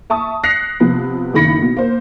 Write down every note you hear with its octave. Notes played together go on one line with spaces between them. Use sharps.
E5 A5 C#6 D#6
F#6 A#6 C7 C#7 F7
C3 F3 B3
F#1 B1 D#3 B5 A#6 C#7
B2
A#3 C5